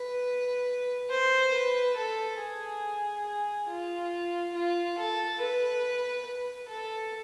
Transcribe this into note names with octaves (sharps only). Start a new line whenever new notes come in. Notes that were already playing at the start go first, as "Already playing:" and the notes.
Already playing: B4
C5
B4
A4
G#4
G#4
F4
F4
A4
B4
B4
A4